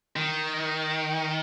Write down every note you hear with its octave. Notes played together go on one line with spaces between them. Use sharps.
D#3